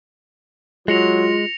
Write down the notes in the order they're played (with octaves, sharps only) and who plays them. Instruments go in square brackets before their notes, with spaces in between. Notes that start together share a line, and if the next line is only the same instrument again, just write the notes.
[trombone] F#3 [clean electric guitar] G#3 [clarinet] F4 [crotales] A#6 C#7 F7